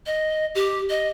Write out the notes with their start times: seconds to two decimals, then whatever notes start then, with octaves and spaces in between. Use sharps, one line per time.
0.06 D#5
0.55 G4
0.90 D#5